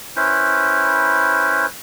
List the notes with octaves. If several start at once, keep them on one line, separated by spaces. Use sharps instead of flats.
C#4 E4 B4 C5